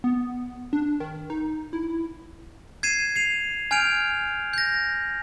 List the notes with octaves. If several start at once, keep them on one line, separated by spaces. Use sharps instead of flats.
B3
D4
D#3
D#4
E4
G#6 C7 D#7 E7
C7 D#7 F7
G#5 F6 G6 G#6 D7 F7
G6 A#6